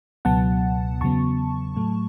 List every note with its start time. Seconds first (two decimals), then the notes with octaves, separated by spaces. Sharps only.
0.25 C#2 B2 F#3 B3 F#5 A5
1.01 E2 C#3 F#3 B3 A5 C#6
1.76 A2 F#3 A3